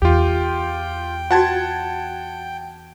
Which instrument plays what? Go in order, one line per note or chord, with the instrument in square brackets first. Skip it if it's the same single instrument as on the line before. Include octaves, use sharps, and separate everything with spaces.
[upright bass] E2 [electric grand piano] F4 G4 [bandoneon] G5
[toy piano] F4 F#4 [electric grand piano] F#5 A5 G#6